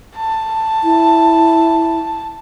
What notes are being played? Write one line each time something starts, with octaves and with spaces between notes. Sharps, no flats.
A5
E4